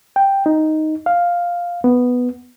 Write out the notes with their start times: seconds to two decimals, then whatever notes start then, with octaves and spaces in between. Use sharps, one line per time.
0.16 G5
0.46 D#4
1.06 F5
1.84 B3